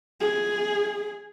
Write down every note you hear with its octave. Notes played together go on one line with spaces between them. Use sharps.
G#4